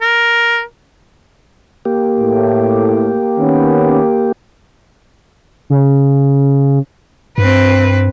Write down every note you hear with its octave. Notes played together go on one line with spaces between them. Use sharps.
A#4
A#3 G4
A2
D#3 B3 C#4
C#3
G2 C4 B4